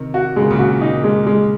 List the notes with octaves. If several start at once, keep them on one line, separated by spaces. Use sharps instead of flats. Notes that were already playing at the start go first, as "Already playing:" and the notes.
Already playing: C3 D#3
F#4
C#3 G#3
D#3
A#2 C#3
F#4
D#4
G#3
G#3